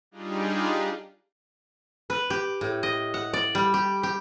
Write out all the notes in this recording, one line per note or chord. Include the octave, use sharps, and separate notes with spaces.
G3 D4 D#4 F4 G4 G#4
B4
G4
A2
D#5
F#5
D5
G3
G4
G4